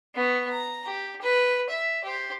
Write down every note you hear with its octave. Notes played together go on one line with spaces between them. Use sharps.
B3 C#6
A#5
G4
B4
E5
G4 C5